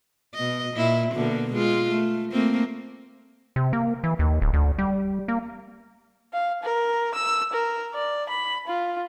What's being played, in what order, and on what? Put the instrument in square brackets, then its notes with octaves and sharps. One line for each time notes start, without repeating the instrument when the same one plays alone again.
[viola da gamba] B2 D#5
A#2 E4
B2 D3 A#3
G#3 F4
A3
A3 A#3 C4
[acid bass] C3
A#3
E3
D#2
D1
D2
G3
A#3
[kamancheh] F5
A#4
E6
A#4
D5
B5
F4